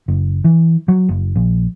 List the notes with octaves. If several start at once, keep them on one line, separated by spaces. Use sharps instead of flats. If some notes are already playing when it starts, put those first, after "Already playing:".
F#1
E3
F#3
F#1
A#1